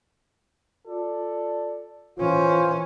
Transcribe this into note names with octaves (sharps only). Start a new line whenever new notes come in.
F4 A4 D5
E3 C#4 F4 C5